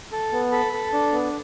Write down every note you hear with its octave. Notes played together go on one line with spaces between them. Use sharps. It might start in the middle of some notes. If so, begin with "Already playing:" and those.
A4
B3
A4 B5
A4
D4
B3